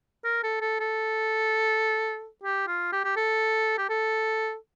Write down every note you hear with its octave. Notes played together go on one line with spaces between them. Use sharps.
A#4
A4
A4
A4
G4
F4
G4
G4
A4
G4
A4